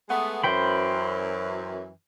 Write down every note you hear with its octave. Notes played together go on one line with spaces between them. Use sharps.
G#3 A3 B3
F#2 E3 C5 G5 B5